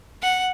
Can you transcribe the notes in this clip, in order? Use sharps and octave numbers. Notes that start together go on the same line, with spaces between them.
F#5